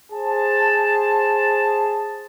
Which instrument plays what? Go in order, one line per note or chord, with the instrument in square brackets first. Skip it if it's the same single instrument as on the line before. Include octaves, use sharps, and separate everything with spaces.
[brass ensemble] G#4 C5 A5